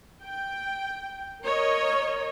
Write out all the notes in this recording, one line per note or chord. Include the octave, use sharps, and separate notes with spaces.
G5
A#4 C#5 D#5